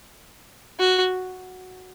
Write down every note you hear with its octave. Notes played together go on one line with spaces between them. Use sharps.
F#4